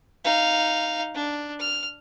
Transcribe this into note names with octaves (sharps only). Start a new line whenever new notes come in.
D#4 F5
D4
F6